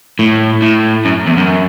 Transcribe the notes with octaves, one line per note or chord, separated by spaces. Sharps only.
A2
A2
F#2
E2
F#2